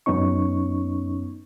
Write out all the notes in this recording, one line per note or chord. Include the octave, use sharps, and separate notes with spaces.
F#2 B3 C#4 D#4 C#6